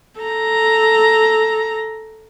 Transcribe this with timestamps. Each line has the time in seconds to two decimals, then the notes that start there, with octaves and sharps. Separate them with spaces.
0.20 A4 A#5